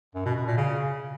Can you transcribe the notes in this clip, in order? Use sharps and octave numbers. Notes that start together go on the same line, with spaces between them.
F#2
B2
B2
A#2
C#3